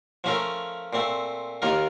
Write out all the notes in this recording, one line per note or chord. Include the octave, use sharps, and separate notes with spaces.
F3 A3 C#4 F4 A#4
A#2 A3 C4
D#2 D#3 A#3 F4 A#4